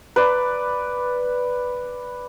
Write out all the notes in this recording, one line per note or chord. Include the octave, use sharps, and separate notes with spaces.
B4 D5